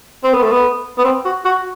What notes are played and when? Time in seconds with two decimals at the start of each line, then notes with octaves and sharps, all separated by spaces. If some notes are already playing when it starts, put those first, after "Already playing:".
0.24 C4
0.34 B3
0.42 A3
0.52 B3
0.98 B3
1.04 C4
1.25 F#4
1.45 F#4